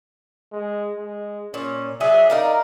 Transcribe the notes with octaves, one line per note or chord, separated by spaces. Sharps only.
G#3
G#3
A#2 C#4
F#3 D4 G#4 E5
D#4 A#4 D5 F5